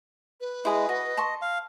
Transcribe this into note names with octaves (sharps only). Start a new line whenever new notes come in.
B4
G#3 E4 G#4 D#5
F#4 D#5
A5 C6 C#6
F5